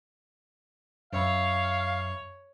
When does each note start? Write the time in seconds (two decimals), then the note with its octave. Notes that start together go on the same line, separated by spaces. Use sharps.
1.13 F#2 C#5 E5 F5 B5